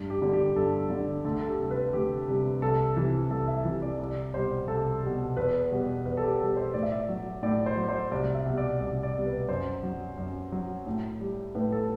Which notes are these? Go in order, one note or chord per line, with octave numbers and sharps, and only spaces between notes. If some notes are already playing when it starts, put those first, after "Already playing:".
Already playing: G2
G4
D3 G3
G4
G2 A4
D3 G3
D2 A4
A4
G4
C3 G3
B4
D2 G4
C3 G3
C2 A4
C3 E3
C2 A4
E5
C3 E3
D5
C2 D5
B2 G3 C5
C2 A4
B2 G3
E2 B4
B2 G3
E2 B4
A4
G4
B2 G3 A4
C5
A2 D5
E5
D5
F#3
A2 D5
C5
F#3
C5
C2 D5
E5
B2 G3
D5
C2 D5
D5
B2 G3
B4
F#2 C5
F#3
F#2
F#3
A2
G3
A2 B4
A4